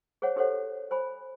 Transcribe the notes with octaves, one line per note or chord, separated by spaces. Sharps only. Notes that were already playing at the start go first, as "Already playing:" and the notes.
G#4 C5 C#5 F#5
D4 G4 A4 C5 C#5 F#5
C5 G#5 B5